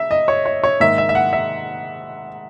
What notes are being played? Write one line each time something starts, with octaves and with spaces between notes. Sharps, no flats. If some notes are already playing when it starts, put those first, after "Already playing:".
Already playing: E5
D#5
C#5
C#5
C#5
G#2 D#3 A#3 E5
E5
E5
F#5
E5